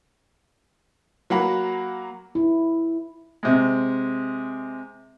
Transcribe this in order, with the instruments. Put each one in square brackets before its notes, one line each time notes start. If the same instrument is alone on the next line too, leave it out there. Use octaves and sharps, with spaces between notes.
[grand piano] F#3 A#3 F#5 B5
[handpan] E4
[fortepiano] C3 G#3